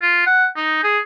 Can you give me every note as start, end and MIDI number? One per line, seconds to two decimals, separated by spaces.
0.02 0.24 65
0.27 0.46 78
0.56 0.83 63
0.84 0.99 68